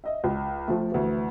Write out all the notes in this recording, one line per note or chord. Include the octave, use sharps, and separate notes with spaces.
D#5 E5
C#2
F3 A3
D2 E3